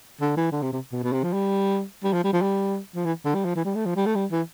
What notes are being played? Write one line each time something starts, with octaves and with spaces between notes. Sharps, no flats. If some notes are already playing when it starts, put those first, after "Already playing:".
D3
E3
D3
C3
C3
B2
B2
C3
F3
G3
G3
F3
G3
F3
G3
F3
E3
D3
G3
F3
E3
G3
A3
F3
G3
A3
G3
E3